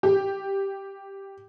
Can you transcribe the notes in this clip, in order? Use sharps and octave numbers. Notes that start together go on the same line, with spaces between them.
G4